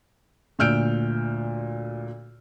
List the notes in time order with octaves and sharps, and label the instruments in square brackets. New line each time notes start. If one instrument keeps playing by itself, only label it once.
[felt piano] D2 A#2 E6 F6 G6 D7